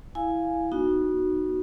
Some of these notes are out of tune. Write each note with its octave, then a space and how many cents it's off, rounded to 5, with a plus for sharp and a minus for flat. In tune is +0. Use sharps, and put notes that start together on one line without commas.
E4 +0 F5 +0 G#5 +0
B3 -30 D#4 -20 F#4 +0